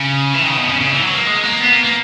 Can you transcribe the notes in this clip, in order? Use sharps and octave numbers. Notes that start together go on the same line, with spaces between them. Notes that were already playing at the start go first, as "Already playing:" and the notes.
Already playing: C#3
E3
D#3
C#3
B2
C#3
C#3
E3
F#3
A#3
G#3
A#3
B3
A#3
A#3